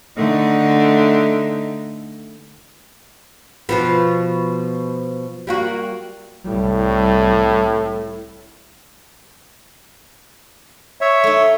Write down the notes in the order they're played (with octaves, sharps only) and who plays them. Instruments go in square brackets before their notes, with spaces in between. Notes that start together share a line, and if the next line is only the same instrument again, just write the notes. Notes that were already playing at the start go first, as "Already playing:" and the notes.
[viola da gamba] D3 A3 D#4
[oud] B2 F3 B3
G3 A#3 F#4
[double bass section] C2 G3 [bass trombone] A2
[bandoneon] C#5 E5
[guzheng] A3 D#4